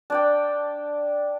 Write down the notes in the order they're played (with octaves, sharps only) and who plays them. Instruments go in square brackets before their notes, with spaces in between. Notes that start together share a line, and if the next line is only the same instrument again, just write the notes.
[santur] D4 D5 G5